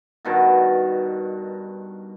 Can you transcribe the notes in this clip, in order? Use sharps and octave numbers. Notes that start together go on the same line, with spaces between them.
G2 B2 D#3 A5